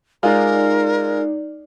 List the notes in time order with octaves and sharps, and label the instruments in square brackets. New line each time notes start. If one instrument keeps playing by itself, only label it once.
[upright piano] G#3 F4 [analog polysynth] D#4 D5 [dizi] A#4